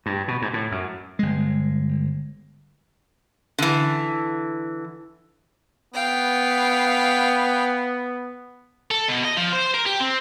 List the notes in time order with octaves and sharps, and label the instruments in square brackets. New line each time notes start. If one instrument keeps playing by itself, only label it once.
[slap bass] G2
B2
G#2
A2
F#2
G1 G#3
[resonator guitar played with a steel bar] D3 E3
[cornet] B3 [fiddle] F5 G5
[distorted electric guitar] A4
B2
D#5
F3
C5
A#4
G4
C4